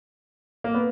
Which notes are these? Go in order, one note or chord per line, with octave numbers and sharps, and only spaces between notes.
A#3
B3